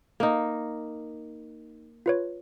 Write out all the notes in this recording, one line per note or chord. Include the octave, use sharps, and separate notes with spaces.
A#3 D#4
F4 B4 C#5